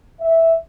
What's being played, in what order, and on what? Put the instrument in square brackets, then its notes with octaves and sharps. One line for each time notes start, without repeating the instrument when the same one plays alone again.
[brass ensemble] E5